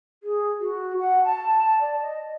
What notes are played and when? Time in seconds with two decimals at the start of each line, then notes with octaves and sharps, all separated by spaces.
0.23 G#4
0.60 F#4
0.99 F#5
1.25 A5
1.81 D5
2.02 D#5